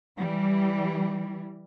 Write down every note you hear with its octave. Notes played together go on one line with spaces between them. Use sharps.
E3 G3